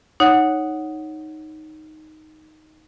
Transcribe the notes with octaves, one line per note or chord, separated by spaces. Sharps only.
D#4 C#5 F#5 F#6